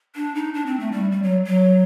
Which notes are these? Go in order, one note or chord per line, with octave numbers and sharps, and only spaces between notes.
D4
D#4
D4
C4
A3
G3
G3
F#3
F#3